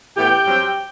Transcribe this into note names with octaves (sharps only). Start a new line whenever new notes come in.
A2 E3 B3 G4 G5
G2 F#3 C4